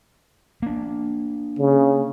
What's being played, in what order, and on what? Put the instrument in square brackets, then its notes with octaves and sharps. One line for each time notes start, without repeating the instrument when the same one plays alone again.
[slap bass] A#3 D4
[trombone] C#3